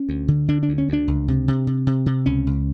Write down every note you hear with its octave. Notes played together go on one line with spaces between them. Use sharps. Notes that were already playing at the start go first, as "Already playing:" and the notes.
Already playing: C#4
D2
D3
D3 D4
D4
D2
C#4
D2 D4
C#2
C3
C3
C3
C3
C3
C#2 C#4
C#2